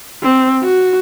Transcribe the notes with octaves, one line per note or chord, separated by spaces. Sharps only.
C4
F#4